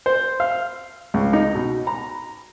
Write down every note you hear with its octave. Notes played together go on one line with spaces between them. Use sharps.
C5
F5
C#2
D#4
B2
A#5